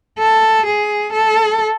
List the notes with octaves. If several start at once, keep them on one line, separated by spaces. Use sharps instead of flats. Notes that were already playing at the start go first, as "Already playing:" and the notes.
A4
G#4
A4